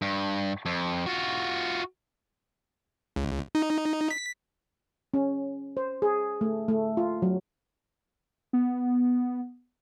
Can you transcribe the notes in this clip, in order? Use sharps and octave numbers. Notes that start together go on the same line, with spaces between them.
G2
F2
F4 F#4
C#2
D#4
B6
C#4
C5
G#4
A3
A3
F4
F#3
B3